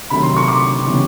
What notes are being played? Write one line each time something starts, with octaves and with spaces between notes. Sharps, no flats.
C3 D#3 F#3 A3 B5
C6
C#6
D6
C#3 E3 G3 B3